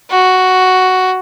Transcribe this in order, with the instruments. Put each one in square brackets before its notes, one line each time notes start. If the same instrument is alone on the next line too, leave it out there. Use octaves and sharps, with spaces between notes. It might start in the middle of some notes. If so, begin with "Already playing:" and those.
[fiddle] F#4